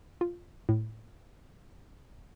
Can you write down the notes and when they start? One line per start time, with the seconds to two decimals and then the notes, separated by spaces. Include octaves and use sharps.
0.21 F4
0.69 A2